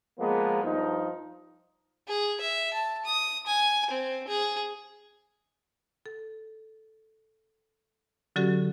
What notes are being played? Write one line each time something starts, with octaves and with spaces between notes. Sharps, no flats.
F3 G#3 A#3 B3
G2 F3 D#4
G#4
E5
A5
D#6
G#5
C4
G#4
A4
D3 F#3 C#4 F#4 G4 A4